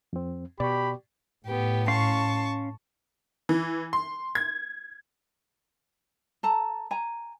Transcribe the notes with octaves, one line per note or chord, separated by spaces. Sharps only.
F2 C4
B2 G4 D5 B5 C#6
A2 B3 G4
C#4 F5 A5 C6 C#6
E3
C6
G#6
A4 A5 A#5
G#5 A#5